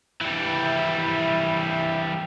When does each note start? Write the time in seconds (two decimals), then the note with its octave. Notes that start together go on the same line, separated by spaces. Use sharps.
0.21 E3 G3
0.47 E4 E5